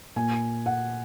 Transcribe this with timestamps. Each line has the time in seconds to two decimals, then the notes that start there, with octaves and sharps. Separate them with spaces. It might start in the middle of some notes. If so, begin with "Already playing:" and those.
0.16 A#2 G#5
0.66 F#5